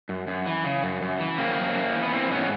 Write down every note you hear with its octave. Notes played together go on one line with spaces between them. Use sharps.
F#2
F#2
E3
C#3
F#2
F#2
E3
C#3 A#3 C4
F#2
F#2
E3
B3
E3 A#3 C4
G#2 B3 C#4